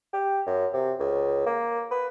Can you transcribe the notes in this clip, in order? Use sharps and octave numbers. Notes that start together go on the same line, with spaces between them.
G4
F#2
C3
C#2
A#3
B4